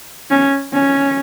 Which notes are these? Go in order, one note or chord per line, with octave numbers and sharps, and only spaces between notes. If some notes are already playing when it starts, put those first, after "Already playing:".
C#4
C#4